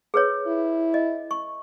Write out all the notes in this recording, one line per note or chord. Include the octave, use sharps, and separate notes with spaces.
G#4 B4 C#5
E4
D#5
C#6